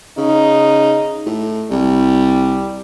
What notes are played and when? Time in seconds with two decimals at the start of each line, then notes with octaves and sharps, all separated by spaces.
0.18 C#3 D#4
1.26 A2
1.71 C2 G3